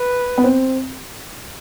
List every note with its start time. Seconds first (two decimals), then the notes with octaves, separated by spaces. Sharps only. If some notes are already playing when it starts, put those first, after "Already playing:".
Already playing: B4
0.38 B3
0.44 C4